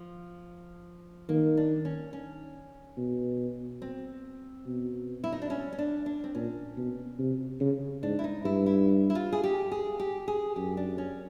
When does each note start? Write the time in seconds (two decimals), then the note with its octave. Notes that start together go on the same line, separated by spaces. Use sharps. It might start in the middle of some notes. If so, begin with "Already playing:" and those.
Already playing: F3
1.29 D#3 A#3
1.57 D4
1.85 C#4
2.13 C#4
2.97 B2
3.82 C4
4.66 B2
5.24 E4
5.32 D#4
5.42 D4
5.50 C#4
5.73 C#4
5.78 D4
6.06 D4
6.24 C4
6.35 A#2 C#4
6.77 B2
7.19 C3
7.61 C#3
8.03 G#2 D4
8.19 E4
8.24 D#4
8.45 G2 E4
8.66 E4
9.10 E4
9.15 F4
9.32 G#4
9.44 G4
9.72 G#4
9.99 G4
10.28 G#4
10.56 F#2 G4
10.77 D4
10.98 C#4